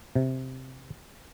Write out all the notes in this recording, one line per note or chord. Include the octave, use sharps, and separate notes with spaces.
C3